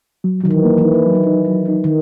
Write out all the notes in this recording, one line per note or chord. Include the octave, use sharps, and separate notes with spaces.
F#3
D#3 F#3
E3
A#3
E3
D#4
F#3
D#4
F#3
D#4
D#3